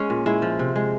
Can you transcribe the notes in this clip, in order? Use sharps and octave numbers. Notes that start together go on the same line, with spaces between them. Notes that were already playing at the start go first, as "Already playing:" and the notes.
Already playing: G#3 C#4
A#2
G#3 E4
F3
C3
G#3